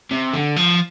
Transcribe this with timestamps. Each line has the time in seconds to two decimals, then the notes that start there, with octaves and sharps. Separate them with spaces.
0.11 C3
0.33 D3
0.56 F3